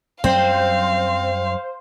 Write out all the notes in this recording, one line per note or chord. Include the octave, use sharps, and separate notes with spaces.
F#2 F#3 G3 C4 C5 F5